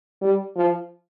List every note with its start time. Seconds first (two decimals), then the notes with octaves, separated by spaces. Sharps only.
0.22 G3
0.56 F3